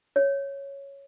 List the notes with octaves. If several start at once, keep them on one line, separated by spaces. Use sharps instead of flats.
C#5